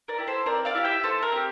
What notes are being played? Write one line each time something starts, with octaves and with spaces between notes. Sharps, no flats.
A#4 D5
E4 G4
A4 C5
C4 A#4 D5
D5 F5
E4 G4
E5 G5
A3 A4 C5
A#4
C4 G4